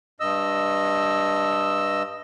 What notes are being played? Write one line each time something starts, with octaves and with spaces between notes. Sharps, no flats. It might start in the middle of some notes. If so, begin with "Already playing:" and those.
G2 D#5 E6